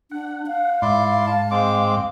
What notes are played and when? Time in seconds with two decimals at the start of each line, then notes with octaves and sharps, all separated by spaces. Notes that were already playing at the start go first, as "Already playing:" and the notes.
0.11 D4 F#5
0.47 F5
0.82 G#2 E4 D5 C6
1.27 A5
1.51 G#3 C4 D6